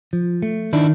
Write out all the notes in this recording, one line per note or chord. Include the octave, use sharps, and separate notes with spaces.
F3
A3
D#3 D4 E4